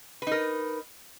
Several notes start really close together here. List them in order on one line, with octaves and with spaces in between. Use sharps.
B4 D#4 A#4